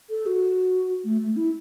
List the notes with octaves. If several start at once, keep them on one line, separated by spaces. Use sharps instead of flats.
A4
F#4
A3
A3
E4